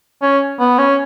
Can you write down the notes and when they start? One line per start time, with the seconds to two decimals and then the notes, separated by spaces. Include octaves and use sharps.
0.22 C#4
0.60 B3
0.78 C#4